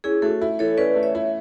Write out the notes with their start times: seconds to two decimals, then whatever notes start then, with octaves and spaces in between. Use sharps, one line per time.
0.04 C#4 E4 G#4
0.22 A3 F#4 A4
0.41 E4
0.59 E3 A4 C#5
0.77 C#4 B4 D5
0.96 A3
1.03 C#5 E5
1.15 E4